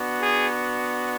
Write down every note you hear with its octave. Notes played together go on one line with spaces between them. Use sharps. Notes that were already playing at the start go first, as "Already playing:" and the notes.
Already playing: B3 D4 F#4
G#4